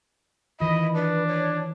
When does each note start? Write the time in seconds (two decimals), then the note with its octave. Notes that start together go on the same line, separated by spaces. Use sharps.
0.60 D#3 E3 F4 D#5 B5
0.95 D4 B4
1.28 C#5